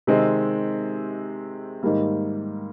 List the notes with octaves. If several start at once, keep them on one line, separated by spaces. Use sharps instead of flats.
C3 D#3 G#3 C4
G#2 D#3 G3 A#3